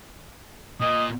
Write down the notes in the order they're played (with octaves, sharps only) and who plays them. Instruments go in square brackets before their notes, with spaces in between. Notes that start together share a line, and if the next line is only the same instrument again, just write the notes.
[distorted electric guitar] A#2 [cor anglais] D#5